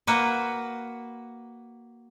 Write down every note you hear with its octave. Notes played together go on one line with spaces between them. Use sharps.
A#3 F#4 B4